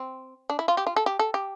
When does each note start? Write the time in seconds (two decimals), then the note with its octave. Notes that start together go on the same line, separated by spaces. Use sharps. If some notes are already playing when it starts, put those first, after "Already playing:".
Already playing: C4
0.50 D4
0.59 E4
0.68 F4
0.77 G4
0.87 F4
0.96 A4
1.06 G4
1.19 A4
1.34 G4